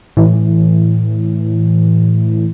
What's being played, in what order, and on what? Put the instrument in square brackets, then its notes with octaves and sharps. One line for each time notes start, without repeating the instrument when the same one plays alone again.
[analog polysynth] A2 E3